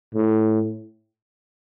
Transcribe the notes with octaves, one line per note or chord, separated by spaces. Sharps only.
A2